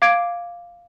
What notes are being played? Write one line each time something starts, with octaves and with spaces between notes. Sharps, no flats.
F5 D6 G#6 D7